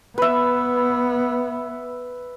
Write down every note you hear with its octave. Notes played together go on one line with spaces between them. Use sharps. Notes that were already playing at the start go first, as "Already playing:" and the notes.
B3 B4 E5